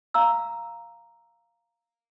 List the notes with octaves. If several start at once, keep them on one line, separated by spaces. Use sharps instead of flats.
F5 A#5 E6